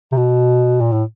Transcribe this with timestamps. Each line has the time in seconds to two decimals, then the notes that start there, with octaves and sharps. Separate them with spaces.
0.12 C3
0.17 B2
0.81 A#2
0.93 A2